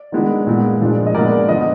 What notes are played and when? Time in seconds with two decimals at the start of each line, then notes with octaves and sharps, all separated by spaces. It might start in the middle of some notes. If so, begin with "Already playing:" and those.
Already playing: D5
0.12 D#3 G#3 B3 D4
0.47 A#2 G#3 B3
0.80 A#2 F3 G#3 D4
1.06 D#5
1.14 A#2 G#3 B3 D4 A#4 D5
1.48 D3 F3 B3 B4 D#5